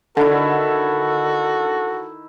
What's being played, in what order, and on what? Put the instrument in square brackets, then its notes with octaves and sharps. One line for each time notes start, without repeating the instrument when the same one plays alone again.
[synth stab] D3 [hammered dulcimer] D#3 E4 [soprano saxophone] F#4 [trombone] A4